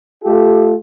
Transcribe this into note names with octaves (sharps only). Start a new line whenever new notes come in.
A3 F4 G4 A4